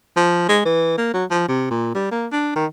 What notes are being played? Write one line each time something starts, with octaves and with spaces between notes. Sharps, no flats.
F3
G#3
E3
A#3
F#3
F3
C3
A#2
G3
A#3
D4
D#3